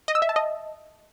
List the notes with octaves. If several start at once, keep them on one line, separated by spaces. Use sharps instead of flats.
D#5
E6
E5
A5
D#5